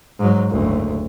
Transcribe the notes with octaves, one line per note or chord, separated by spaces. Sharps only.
G#2 F#3
F#1 D2